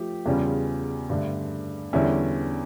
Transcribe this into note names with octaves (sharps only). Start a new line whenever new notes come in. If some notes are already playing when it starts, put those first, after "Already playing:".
Already playing: F3 A3 G4
E2 C#3 G3 C#4 F4
G2 D3 A3
E2 D3 G3 C#4 E4